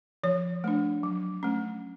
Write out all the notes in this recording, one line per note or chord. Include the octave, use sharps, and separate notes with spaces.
F3 C#5
A3 D4
F#3
A3 C#4